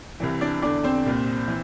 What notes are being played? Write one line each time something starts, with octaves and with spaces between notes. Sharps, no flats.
C2 C3 E3
D4 D5
E2 D3 D4 D5
C4 C5
C2 A#2
E3